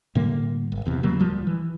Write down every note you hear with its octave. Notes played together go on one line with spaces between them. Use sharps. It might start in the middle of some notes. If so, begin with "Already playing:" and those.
A2 D3 G3 A#3
G#1
E1 E2 C3
C#3 F#3 G3 A#3
D1 F3 G3
E3